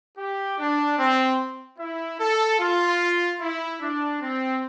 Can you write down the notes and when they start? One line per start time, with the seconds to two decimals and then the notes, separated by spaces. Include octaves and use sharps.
0.18 G4
0.59 D4
0.98 C4
1.79 E4
2.20 A4
2.59 F4
3.40 E4
3.81 D4
4.21 C4